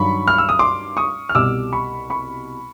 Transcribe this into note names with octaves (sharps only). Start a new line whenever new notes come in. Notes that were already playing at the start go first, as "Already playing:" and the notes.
Already playing: G2 D#3 F#3 B5 C#6
F6
E6
D#6
C6 D6
C#6 D#6
F6
C2 B2 G3 D6 E6
B5 C#6
B5 C#6